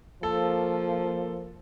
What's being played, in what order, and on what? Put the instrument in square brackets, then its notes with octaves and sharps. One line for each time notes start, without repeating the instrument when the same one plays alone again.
[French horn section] F3 A#3 [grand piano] A4